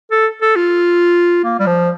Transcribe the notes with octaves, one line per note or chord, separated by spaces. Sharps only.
A4
A4
F4
A#3
G3
F3